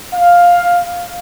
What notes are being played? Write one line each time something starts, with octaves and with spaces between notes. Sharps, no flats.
F5